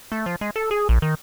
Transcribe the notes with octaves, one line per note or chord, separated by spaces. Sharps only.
A3
F3
G#3
A4
G#4
A#1
D#3